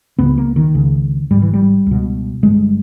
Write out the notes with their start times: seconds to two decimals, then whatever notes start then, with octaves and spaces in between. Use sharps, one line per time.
0.19 C#2 C#3 B3
0.38 A#3
0.56 D#3
0.75 C#2 C#3
1.31 G#1 G#2 G3
1.42 E3
1.54 G3
1.87 C#2 B2
2.43 G1 G2 G#3